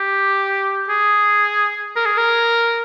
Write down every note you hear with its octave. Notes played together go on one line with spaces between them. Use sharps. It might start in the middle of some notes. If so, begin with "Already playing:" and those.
Already playing: G4
G#4
A#4
G#4
A#4